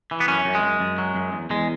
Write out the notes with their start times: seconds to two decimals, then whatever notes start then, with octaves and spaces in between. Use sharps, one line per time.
0.11 E3
0.20 B3
0.28 F#2 C#4
0.45 F#2
0.55 G#3
0.63 F#2
0.80 F#2
0.98 F#3
1.15 F#2
1.33 E2
1.50 E2 G#3